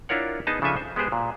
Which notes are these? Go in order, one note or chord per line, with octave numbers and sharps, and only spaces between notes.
D4 E4 F4 A#4 C#5 F#5
B3 D#4 G#4 D#5 A5
C#3 F3 D4 A4 E5 G#5
C5
G#3 B3 G4 G#4 C5
A#2